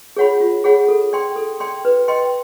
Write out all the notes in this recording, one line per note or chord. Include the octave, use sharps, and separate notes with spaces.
G#4 C#5 F#5 B5
F4
G#4 C#5 F#5 B5
A4
D5 G5 C6
A4
D5 G5 C6
B4
D#5 G5 C6